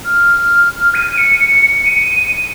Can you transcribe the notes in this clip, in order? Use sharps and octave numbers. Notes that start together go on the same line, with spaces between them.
F6
D#7
C#7
C#7
C#7
D#7
D#7